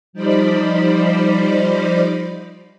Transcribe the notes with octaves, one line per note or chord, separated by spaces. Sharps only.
F3 G3 D#4 C5 D5 B5